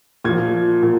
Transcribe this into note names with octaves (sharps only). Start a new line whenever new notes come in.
A#2 F3 G#6
A#2